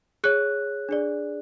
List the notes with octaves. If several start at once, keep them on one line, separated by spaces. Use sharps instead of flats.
G#4 C#5 F#6
D4 G#4 D5